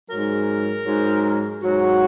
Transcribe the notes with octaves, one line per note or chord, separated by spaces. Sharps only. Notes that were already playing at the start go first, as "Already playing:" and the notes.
G#2 F#3 A#4
G#2 F#3
G#2 F#3 F#4